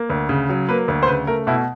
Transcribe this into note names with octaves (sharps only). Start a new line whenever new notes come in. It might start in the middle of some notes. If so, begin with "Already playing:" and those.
Already playing: A#3
D2
C#3
F#3
A#3 B4
D2
C5
C#3 B4
A3 A#4
B2 E4